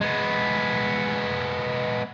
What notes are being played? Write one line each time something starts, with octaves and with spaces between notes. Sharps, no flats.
G#3 B3